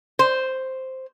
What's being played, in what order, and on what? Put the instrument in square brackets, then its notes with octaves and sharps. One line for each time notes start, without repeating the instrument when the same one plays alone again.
[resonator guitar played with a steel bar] C5